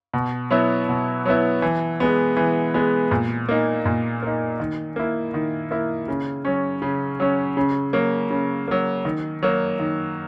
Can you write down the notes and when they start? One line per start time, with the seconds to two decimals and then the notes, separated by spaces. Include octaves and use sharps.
0.14 B2
0.51 F#3 B3 E4
0.89 B2
1.25 F#3 B3 E4
1.62 E3
2.00 G#3 B3
2.37 E3
2.74 G#3 B3
3.11 A#2
3.49 A#3 D#4
3.86 A#2
4.22 A#3 D#4
4.60 D#3
4.96 A#3 E4
5.34 D#3
5.71 A#3 E4
6.08 C#3
6.45 F#3 C#4
6.82 C#3
7.20 F#3 C#4
7.57 C#3
7.93 F#3 A#3
8.31 C#3
8.68 F#3 A#3
9.05 D#3
9.43 F#3 A#3
9.79 D#3